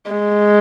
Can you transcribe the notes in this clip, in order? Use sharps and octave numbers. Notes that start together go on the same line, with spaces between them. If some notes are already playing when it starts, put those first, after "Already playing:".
G#3